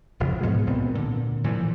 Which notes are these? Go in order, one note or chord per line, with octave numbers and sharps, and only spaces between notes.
F1 F2 C#3 F3
G#2 B2 F3 G#3
C#2 A#2 B3 C4
A#2 D3
A#2 E3 F3